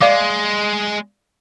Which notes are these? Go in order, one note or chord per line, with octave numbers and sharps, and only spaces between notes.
G#3 D5 F5 D6